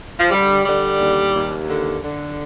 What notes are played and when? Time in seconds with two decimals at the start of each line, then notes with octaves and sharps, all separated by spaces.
0.19 F3
0.31 D3 G3
0.65 D3 G3
1.00 D#2
1.35 D#2
1.69 D3
2.03 D3